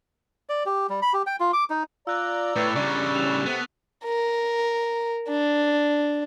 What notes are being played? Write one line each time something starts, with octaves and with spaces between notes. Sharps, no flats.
D5
G4
G3
B5
G4
G5
F4
D6
D#4
F4 D5 A#5 E6 F#6
A2 B4 E6 A6 C#7
C#3 G3 D4 C#6
A2 C#4 G4 F#6 E7 F7
C3 B3 A4
A#4
D4